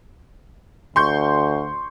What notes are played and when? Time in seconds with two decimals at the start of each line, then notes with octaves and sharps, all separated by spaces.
0.96 D2 C6 C#6 G6